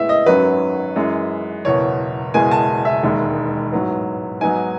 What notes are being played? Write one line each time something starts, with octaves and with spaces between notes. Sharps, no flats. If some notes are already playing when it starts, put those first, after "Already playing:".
Already playing: A2 G#3 B3 E4 E5
D#5
G#1 F#2 D#3 F#3 C#4 B4
F#2 E3 G#3
F#1 E2 B2 C#5
F#1 E2 B2 G#3 G#5
A5
E5
E1 D#2 D#3 G#3
A1 G#2 F#3 B3
G#2 F#3 B3 D#4 G#5